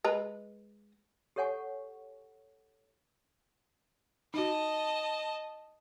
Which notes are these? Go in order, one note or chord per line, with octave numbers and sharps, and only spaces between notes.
G#3 B4 A#5
G4 A4 C#5 F#5 G#5 C#6
D#4 F#4 D#5 A5